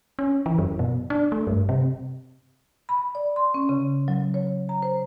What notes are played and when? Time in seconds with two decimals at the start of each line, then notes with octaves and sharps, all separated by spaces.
0.19 C#4
0.46 E3
0.58 F#2
0.79 B2
1.10 D4
1.32 A3
1.47 G2
1.69 C3
2.89 B5
3.15 D5
3.36 C6
3.54 C#4
3.69 C#3
4.08 F#3
4.34 C#5
4.69 A#5
4.83 C5